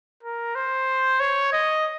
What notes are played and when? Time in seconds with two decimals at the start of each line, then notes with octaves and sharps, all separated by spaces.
0.23 A#4
0.55 C5
1.20 C#5
1.53 D#5